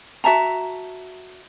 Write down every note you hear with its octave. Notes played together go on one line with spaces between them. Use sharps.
F#4 E5 A5 A#5